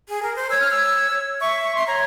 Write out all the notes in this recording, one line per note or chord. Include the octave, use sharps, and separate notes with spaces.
G#4
A#4
C5
C#5 E6
F6
E6
E5 C#6
C#6
E5 C6
C#5 A#5